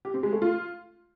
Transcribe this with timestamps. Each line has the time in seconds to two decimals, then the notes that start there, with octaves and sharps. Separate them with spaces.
0.05 G4
0.14 C4
0.23 G#3
0.32 A3
0.42 F4